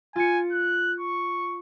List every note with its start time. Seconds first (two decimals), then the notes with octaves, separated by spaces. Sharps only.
0.16 F4 G#5 C#7
0.52 F#6
1.00 C#6